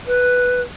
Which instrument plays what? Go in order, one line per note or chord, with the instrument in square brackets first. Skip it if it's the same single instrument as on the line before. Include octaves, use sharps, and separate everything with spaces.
[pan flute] B4